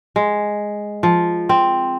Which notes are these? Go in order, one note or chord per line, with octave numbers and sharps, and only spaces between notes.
G#3
F3
C4